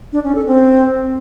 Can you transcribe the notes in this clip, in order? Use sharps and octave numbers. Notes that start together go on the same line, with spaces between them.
D4
C#4
A4
C4